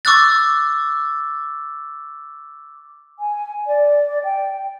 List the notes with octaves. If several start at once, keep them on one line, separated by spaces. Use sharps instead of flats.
C#6 D6 E6 F#6 A6
G#5
D5
G5